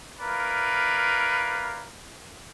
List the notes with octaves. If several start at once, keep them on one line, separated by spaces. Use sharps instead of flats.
E4 A#4 B4 D5 F5